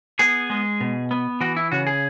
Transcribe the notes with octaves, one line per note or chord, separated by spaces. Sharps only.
B3 G#4
G#3
B2
B3
E3 F#4
E4
C#3 F#4
G#4